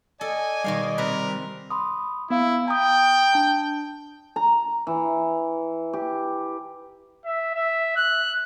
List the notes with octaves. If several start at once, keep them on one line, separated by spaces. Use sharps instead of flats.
A4 D5 D#5 G#5
B2 D#3 G3 F5
C3 A#4 B4
B5 C6 D#6
B3 E4 F5
G5 A#5 D#6
D4 A5
A#5
E3
G4
E5
E5
F#6